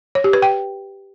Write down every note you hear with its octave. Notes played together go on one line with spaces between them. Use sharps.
C#5
G4
B4
G5